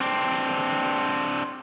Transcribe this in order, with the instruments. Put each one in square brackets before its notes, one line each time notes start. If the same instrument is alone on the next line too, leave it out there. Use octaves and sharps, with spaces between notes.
[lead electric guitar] C4 D4